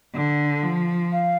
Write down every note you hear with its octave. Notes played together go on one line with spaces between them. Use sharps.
D3
F3
F5